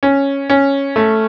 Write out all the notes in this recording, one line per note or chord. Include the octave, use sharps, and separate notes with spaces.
C#4
C#4
A3